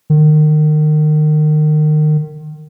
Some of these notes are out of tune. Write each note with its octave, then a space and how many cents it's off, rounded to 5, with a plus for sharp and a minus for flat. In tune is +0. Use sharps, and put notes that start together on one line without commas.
D#3 -30